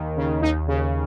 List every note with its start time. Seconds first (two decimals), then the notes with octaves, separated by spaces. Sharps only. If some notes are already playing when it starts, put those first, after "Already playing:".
Already playing: D#2 D#3
0.17 C#3
0.42 D#2 D#4
0.68 C#3